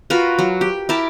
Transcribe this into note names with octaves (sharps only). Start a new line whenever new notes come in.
F4 F#4 A#4 B4
F#3
G4
E4 G4 A#4 A5